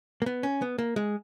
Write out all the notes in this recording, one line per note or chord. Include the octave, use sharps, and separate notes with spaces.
A#3
B3
C#4
B3
A#3
G#3